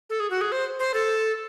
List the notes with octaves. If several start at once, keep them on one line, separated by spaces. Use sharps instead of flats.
A4
G#4
F#4
G#4
C5
C5
A4